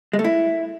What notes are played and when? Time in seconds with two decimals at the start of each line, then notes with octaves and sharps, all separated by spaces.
0.13 G#3
0.19 A3
0.24 E4